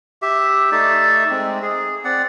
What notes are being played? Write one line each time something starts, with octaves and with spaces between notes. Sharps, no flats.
G4 E5
A3 D#4 D5 E5
G#3 C4
G#4
C4 D5 F#5